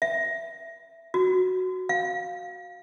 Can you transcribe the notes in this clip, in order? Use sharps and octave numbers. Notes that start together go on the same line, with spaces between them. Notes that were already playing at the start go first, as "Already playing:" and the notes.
E5
F#4
F5